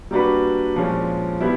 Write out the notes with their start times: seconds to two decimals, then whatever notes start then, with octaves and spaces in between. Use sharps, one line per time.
0.11 G3 A#3 D4 F#4 B4
0.76 A#2 F3 G#3 C#4
1.40 G3 B3 E4